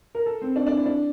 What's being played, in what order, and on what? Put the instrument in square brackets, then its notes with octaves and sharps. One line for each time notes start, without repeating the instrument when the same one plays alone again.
[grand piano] A#4
A4
C4
D4
D4
E4
D4